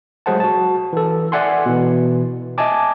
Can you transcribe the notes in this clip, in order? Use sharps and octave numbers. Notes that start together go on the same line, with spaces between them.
F#3 G#3 G#4 C5 F#5 A5
F#4 A5
E3 A4
D5 E5 F#5 G#5 C6
B2 E3
D#5 E5 G#5 A5 D6